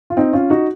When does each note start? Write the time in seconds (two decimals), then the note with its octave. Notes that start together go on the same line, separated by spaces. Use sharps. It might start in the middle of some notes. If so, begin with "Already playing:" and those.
0.10 F4
0.17 C4 D#4
0.33 C#4 F4
0.50 D#4 F#4